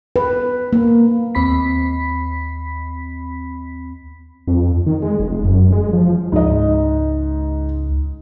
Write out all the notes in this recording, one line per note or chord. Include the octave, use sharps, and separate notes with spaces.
B4
A#3
D#2 C4 B5 B6
F2
D#3
G#3
F1
F#2
G#3
F3
C#2 G#2 D#5